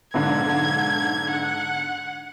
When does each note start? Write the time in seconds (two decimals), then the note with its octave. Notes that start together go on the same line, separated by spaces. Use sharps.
0.14 B1 G#2 D3 G#6
1.30 F#5